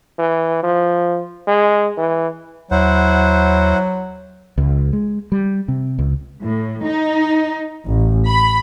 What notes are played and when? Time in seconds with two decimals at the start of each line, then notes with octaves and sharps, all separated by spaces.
0.19 E3
0.63 F3
1.47 G#3
1.97 E3
2.71 D#2 F#3 E4 C5 F#5
4.58 C#2
4.93 G#3
5.32 G3
5.68 C3
5.99 C#2
6.43 A2
6.84 D#4
7.86 A1
8.28 B5